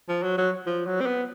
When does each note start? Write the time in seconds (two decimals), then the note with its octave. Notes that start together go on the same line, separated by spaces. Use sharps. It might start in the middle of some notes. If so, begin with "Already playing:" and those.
0.09 F3
0.23 F#3
0.38 F#3
0.67 F3
0.87 F#3
1.01 C4
1.06 B3